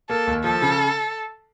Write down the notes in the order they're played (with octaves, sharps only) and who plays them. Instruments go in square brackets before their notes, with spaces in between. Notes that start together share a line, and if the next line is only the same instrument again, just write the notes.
[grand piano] A#3 [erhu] A4
[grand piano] D#2
[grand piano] F3 [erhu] A4
[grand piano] C#3